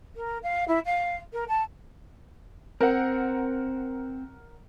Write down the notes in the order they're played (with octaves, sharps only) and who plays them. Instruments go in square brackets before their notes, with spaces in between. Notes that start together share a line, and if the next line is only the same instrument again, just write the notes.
[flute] A#4
F5
E4
F5
A#4
A5
[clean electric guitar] C4 [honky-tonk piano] A#4 F#5